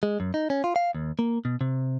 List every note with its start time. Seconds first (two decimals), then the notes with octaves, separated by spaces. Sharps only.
0.03 G#3
0.20 F#2
0.34 D#4
0.50 C#4
0.64 F4
0.76 F5
0.95 D#2
1.19 A#3
1.45 B2
1.61 C3